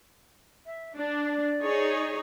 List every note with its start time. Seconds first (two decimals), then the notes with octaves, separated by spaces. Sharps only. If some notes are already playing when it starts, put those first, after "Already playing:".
0.66 E5
0.98 D4 D5
1.62 D#4 G#4 C#5